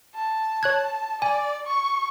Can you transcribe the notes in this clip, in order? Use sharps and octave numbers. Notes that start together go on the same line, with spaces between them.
A5
C#5 F#6 G#6
D5 G#5
C#6